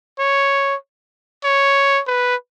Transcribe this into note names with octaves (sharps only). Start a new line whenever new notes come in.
C#5
C#5
B4